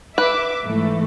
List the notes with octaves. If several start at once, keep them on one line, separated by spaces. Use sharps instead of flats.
B4 E5 D6
G#2 E3 A3